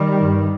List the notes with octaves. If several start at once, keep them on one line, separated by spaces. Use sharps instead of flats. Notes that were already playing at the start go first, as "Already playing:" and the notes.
Already playing: D#3 G3
G2